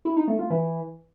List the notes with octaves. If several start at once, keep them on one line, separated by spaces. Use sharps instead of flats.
E4
D#4
A3
F4
E3